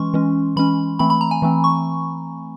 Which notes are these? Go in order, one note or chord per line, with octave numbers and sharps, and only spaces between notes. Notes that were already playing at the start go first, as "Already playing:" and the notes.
Already playing: E3 G#3 C#4 C6 C#6
E3 G#3 C#4
E3 G#3 C#4 B5
E3 A3 C4 B5
B5
A#5
G#5
E3 A3 C4
C#6